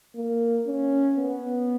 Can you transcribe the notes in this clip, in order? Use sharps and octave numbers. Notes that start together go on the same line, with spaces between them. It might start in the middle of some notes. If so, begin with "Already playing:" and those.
A#3
C#4
B3